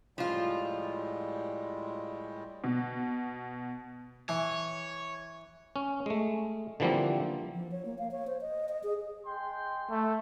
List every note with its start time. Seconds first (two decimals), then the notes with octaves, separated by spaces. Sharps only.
0.18 A2 F3 G3 G#3 F4
2.64 B2
4.29 E3 C#5
5.76 C#4
6.06 G#3 A3
6.80 D3 E3 F3 G3 A#3 C4
7.54 F3
7.72 C#5
7.85 A#3
7.98 F5
8.11 C#5
8.27 C5
8.41 D#5
8.69 D#5
8.83 G#4
9.26 G#3 G5 C6
9.91 A3